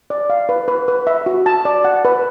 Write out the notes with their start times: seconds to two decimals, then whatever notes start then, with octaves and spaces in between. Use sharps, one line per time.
0.10 D5
0.30 F5
0.49 B4
0.68 B4
0.88 B4
1.07 E5
1.26 F#4
1.46 A5
1.65 D5
1.85 F#5
2.05 B4